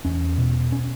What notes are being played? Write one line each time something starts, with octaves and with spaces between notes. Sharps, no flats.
E2 C#4
B2
C#4